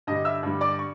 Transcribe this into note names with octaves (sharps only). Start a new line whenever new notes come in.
G2 D3 G3 D#5 D#6
E5 E6
G2 D3 G3
D5 D6
C#6